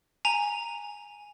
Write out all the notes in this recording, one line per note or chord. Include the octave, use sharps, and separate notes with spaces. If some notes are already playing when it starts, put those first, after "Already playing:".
G#5 A#5 F7